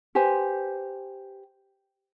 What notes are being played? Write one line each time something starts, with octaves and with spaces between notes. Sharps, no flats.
G4 B4 C5 G#5